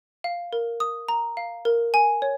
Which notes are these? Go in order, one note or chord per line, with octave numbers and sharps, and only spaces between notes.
F5
A#4
D#6
A#5
F5
A#4
G#5
C#5